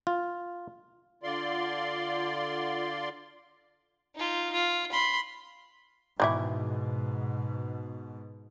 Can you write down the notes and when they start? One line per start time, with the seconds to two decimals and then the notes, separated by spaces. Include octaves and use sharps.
0.07 F4
1.23 D3 F4 D5 C6
4.15 D#4 F4
4.53 F4
4.92 B5 C6
6.20 G#2 B2 D#3 E3 E4